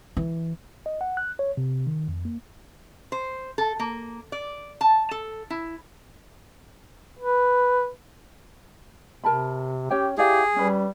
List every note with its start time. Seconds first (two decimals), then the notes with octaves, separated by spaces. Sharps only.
0.17 E3
0.86 D#5
1.01 F#5
1.17 F#6
1.39 C#5
1.57 C3
1.87 D#3
2.08 F2
2.25 A#3
3.12 C5
3.58 A4
3.79 A#3
4.32 D5
4.81 A5
5.11 A4
5.50 E4
7.19 B4
9.24 C3 A#4 A5 B5
9.91 C#4 G4 C#5 G5
10.18 E4 G4 G#4 D5 F5
10.56 G3 C#4 B4